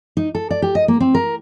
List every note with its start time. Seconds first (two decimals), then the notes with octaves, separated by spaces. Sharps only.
0.17 D#4
0.35 A4
0.51 D5
0.62 G4
0.75 D#5
0.88 A#3
1.00 C4
1.15 A#4